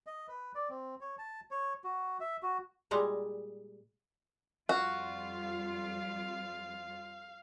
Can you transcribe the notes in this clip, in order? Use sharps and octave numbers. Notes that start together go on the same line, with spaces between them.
D#5
B4
D5
C4
C#5
A5
C#5
F#4
E5
F#4
A#2 G3 G#3 A#5
F2 G3 F4 F#4 F5